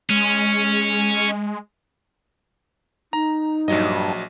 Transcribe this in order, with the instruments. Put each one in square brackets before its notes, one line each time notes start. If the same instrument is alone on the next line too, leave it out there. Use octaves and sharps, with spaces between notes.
[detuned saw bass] G#3 [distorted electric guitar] C#4
[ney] D#4 [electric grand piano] A#5
[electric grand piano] A#1 F#3 D#5 [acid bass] G2